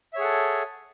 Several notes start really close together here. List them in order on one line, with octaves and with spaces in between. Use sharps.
E5 C#5 G#4 F#5 A4